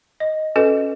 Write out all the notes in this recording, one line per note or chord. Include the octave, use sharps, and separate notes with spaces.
D#5
C#4 F#4 A4 B4 D#5